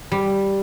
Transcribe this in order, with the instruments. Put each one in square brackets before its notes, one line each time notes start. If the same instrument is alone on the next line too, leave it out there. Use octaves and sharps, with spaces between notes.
[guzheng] G3